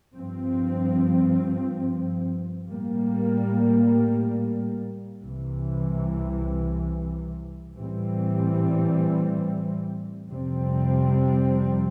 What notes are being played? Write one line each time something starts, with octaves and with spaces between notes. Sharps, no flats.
G2 F3 C4
A2 G3 A#3
C2 C3 E3
A2 E3 G3 C4
F2 C3 G3 C4